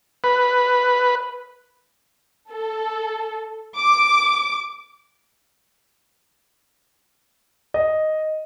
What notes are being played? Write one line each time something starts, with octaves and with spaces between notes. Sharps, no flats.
B4
A4
D6
D#5